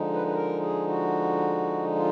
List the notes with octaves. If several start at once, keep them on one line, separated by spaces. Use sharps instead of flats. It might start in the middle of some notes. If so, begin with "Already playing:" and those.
Already playing: D3 F3 G#3 D#4
B4
B4
A#4
G#4
F#4
F4